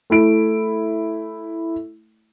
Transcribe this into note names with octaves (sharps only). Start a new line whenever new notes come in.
A3 E4 D7